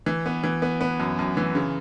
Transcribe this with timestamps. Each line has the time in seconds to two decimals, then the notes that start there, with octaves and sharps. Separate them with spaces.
0.06 E3
0.26 B3
0.44 E3
0.62 B3
0.81 B3
1.00 F#2
1.19 F#2
1.37 E3
1.55 C#3